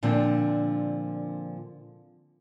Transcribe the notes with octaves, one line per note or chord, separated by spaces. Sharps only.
A#2 D3 F3 C4 D4